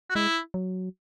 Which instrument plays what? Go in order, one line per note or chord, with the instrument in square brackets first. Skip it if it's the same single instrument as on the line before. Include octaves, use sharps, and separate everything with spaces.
[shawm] F#4
[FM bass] G#3 [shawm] E4
[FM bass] F#3